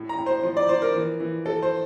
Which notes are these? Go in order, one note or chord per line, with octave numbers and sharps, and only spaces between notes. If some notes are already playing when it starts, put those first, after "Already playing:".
Already playing: A2
A#5
A2
C5
F3 C5
D5
F3 C5
A#4
E3
E3
E3 A4
C5